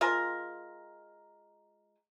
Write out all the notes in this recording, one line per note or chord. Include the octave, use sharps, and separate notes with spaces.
G#3 F4 A#4